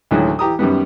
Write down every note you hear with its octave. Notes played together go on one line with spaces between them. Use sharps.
D2 A2 D#3 E3 F#3 G#3
E3 G4 A#5 D#6
F#2 D#3 G3 B3